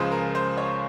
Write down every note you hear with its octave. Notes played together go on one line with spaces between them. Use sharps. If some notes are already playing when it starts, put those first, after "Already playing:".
Already playing: C#2 C#3 F3 G#3 C5
A#4
C5
C#5